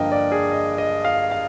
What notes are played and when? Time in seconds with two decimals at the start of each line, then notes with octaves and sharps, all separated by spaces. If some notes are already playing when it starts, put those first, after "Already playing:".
Already playing: G2 D3 F3 A#3 D4 D#5 G5
0.12 D5
0.32 G#4
0.52 D#5
0.78 D#5
1.05 F5
1.31 F5